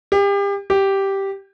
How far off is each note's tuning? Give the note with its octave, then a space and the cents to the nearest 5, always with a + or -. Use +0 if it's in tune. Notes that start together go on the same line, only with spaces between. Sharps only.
G4 +35
G4 -5